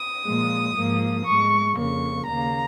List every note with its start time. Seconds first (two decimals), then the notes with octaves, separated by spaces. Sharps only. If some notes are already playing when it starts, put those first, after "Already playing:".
Already playing: D#6
0.24 A#2 F3 G#3
0.76 G#2 F3 A#3
1.25 G#2 G#3 C#6
1.76 F2 C#3 A#3 C#6
2.26 D#2 C#3 A#3 A#5